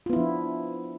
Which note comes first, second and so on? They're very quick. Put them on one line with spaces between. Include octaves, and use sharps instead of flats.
F4 B3 E4 F3 D4